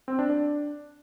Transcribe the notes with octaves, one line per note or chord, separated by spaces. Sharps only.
C4
D4
D4